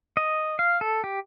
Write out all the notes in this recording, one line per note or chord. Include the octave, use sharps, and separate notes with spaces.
D#5
F5
A4
G4